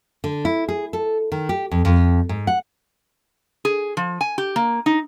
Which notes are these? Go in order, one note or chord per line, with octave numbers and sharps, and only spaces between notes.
D3
E4
G#4
A4
D#3
G4
F2
F2
G#2
F#5
G#4
F3
G#5
G4
A#3
D#4